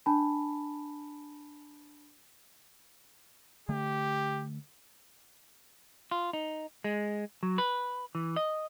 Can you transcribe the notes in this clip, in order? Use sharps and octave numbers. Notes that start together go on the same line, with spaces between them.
D4 G#5 A5 B5
D3 A3 G4
F4
D#4
G#3
F#3
B4
E3
D#5